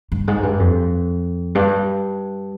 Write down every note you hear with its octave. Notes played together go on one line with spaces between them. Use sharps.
G2
G#2
G2
F2
G2